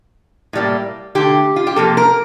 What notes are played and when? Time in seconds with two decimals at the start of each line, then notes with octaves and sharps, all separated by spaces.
0.53 A2 G3 A#3
1.15 D3 A3 G4
1.56 F4
1.67 G4
1.76 C3 F3 A#3 A4
1.97 A#4